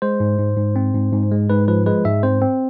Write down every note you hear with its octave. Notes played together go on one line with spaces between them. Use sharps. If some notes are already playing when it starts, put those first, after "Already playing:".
G#3 C5
G#2
G#2
G#2
C4
G#2
G#2
G#3
G#2 B4
F3 B4
G#3 B4
G#2 E5
C4 C5
C4